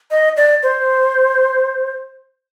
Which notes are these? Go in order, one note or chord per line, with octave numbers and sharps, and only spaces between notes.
D#5
D5
C5